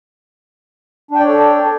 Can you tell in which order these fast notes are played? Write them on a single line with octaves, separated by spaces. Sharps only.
D4 G5 D5 C#5 A4